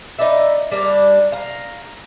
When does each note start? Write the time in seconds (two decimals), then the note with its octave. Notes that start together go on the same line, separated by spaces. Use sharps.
0.19 D#4 B4 D5 E5
0.71 G3 A#3 D4
1.32 F5 A#5